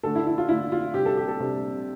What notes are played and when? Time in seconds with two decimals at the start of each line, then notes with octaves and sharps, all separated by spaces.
0.03 D3 A3 D4 A4
0.15 E4
0.27 E4
0.38 F4
0.49 D3 A3 D4 E4
0.72 F4
0.94 C3 G3 D4 G4
1.06 A4
1.17 G4
1.28 A4
1.40 C3 G3 D4